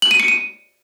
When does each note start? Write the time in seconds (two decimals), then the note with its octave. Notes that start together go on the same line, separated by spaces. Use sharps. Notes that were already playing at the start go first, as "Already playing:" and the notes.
0.02 F#7
0.11 D#7
0.20 C#7
0.28 D#7